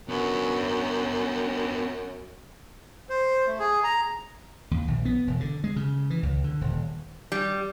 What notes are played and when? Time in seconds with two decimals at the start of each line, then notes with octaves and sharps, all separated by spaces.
0.09 F#2 B3 D4
3.09 C5
3.47 A3
3.59 G#4
3.84 A#5
4.71 D#2
4.88 A#1
5.05 B3
5.27 E1
5.40 D3
5.64 G#3
5.76 C#3
6.10 E3
6.23 C#2
6.44 D3
6.61 D#1
7.32 G3